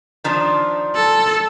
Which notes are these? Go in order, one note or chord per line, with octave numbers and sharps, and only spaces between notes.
D#3 F3 D4
A4